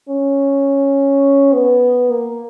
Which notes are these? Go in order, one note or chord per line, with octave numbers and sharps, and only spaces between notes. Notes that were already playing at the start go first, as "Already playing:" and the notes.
C#4
B3
A#3